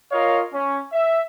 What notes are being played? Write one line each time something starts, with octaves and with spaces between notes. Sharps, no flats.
F4 A#4 C#5 D#5 F5
C#4
E5